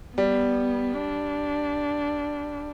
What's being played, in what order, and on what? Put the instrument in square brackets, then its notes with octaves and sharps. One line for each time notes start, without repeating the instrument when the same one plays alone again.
[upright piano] G3 [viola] B3
[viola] D4